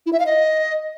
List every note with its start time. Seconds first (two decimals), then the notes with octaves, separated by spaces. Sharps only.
0.06 E4
0.13 E5
0.19 F5
0.26 D#5